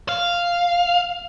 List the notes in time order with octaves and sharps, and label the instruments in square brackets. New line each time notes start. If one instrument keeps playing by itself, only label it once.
[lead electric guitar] F5